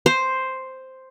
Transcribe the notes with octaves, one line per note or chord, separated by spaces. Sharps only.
C5